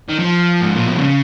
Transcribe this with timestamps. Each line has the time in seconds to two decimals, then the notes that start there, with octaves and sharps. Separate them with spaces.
0.09 D#3
0.20 F3
0.61 G#2
0.74 A#2
0.87 B2
0.98 C#3